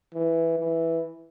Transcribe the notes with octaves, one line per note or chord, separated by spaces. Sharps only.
E3
E3